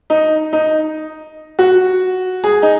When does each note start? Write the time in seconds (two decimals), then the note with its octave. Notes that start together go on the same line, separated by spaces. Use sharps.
0.10 D#4
0.53 D#4
1.59 F#4
2.44 G#4
2.62 D#4